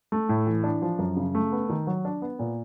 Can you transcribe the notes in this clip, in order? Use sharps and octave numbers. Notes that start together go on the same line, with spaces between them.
A3
A2
E3
D4
F3
F#2
C#3
A3
B3
D#3
F#3
D4
B3
A#2